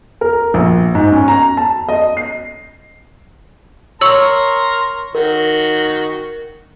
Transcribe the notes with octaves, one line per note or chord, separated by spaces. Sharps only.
A#4
A#1
G#2
C#4
A#5
A5
D#5
C7
A#4 C#5 A#5 C6 E6 F#7
D#3 F#4 A#4